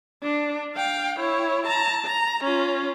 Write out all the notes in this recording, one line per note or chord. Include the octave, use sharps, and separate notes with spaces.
D4
F5 G5
E4 C#5
A5 A#5
A#5
C#4 F4